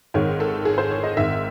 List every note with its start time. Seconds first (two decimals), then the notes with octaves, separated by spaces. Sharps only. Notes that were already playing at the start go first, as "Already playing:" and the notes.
0.14 G#1 G#2 D#3 C#5
0.40 A4
0.65 G#4
0.78 C5
0.91 C#5
1.03 D#5
1.17 G#1 G#2 D#3 E5